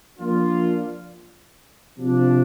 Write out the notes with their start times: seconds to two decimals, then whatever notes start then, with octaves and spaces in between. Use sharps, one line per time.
0.17 F3 A#3 D4 F4
1.98 C3 F3 D4